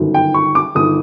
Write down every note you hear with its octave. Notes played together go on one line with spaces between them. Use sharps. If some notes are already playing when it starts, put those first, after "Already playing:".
Already playing: G1 F#2 D#3
G5
C#6
D6
G1 D#3 D#6